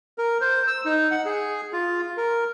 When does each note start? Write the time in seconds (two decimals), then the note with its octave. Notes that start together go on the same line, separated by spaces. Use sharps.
0.18 A#4
0.41 C5
0.67 E6
0.85 D#4
1.11 F#5
1.25 G#4
1.73 F4
2.17 A#4